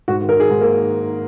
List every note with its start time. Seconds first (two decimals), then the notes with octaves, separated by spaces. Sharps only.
0.08 G#2 F#4
0.21 D#3
0.29 A#4
0.37 D#3 G#4
0.50 G#2
0.61 A#3